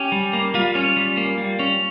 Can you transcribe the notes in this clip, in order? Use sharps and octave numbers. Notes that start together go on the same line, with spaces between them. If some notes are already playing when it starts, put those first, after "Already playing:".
Already playing: C#4 G4
G3
A#3
G3 F4
C#4
G3
A#3
G3
C#4